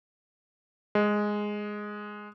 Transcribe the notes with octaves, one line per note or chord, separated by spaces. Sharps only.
G#3